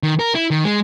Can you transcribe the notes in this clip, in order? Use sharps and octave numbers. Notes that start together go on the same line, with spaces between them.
D#3
A#4
E4
D#3
G#3